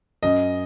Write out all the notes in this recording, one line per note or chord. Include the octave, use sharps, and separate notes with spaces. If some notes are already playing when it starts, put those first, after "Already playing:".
F#2 D#5